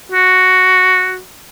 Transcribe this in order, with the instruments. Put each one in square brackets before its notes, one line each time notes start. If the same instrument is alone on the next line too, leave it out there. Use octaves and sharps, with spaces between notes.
[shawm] F#4